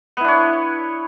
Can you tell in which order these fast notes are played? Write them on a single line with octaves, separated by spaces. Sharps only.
B3 E4 D4 C#5